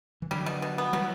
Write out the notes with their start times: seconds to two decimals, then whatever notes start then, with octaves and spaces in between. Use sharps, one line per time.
0.22 E3
0.31 D3 F#3 G3
0.46 B2
0.62 B2
0.78 B3
0.93 E3 F#3 G3